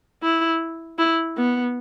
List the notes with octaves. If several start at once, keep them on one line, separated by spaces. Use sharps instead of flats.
E4
E4
B3